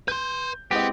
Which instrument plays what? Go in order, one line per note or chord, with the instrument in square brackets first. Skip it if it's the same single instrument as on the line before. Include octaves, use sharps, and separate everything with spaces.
[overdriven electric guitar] B4 C6 [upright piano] G6
[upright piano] G#3 E4 D#5 [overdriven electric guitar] B3 [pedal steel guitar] C4 G4